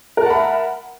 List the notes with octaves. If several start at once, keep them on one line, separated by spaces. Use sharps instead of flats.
A#4 E5 F#5 A5 B5